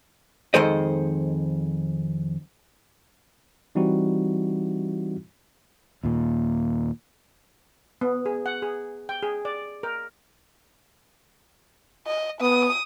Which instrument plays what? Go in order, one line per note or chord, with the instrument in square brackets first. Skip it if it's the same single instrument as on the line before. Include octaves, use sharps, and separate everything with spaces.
[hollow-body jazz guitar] F2 D#3 G#3 A4 C5 D#5
[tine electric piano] E3 G3 C4 D#4 E4 F#4
[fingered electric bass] D#2 A#2
[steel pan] B3
G#4
F#5
G#4
G5
G#4
D5
A#4
[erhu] D#5
[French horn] B3 [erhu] D#6